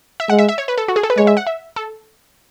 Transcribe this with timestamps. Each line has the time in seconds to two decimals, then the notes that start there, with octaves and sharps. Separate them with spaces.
0.20 E5
0.30 G#3 F#5
0.39 E5
0.49 E5
0.58 C#5
0.68 B4
0.78 A4
0.88 F#4
0.96 G#4
1.03 A4
1.10 B4
1.17 G#3 C#5
1.27 E5
1.37 F#5
1.47 E5
1.76 A4